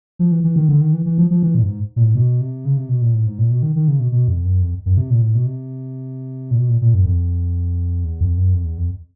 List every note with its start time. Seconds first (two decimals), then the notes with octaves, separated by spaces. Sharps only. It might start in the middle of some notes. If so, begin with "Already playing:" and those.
0.19 F3
0.32 E3
0.44 E3
0.56 D#3
0.69 D3
0.81 D#3
0.93 E3
1.06 E3
1.18 F3
1.31 F3
1.43 E3
1.55 A#2
1.62 G2
1.67 G#2
1.96 A#2
2.04 A2
2.15 B2
2.41 C3
2.65 C#3
2.77 C3
2.89 B2
3.02 A#2
3.14 A2
3.27 G#2
3.38 A#2
3.51 B2
3.63 D#3
3.76 D#3
3.88 C#3
4.00 B2
4.12 B2
4.28 F2
4.45 F#2
4.62 F2
4.86 F#2
4.97 C3
5.10 A#2
5.22 A2
5.35 B2
5.46 C3
6.51 A#2
6.58 B2
6.69 A#2
6.81 A#2
6.94 F#2
7.06 F2
8.05 E2
8.21 F2
8.38 F#2
8.54 F2
8.65 E2
8.78 F2